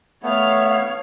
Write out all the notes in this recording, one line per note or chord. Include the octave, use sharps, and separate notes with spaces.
A3 B3 C#5 F5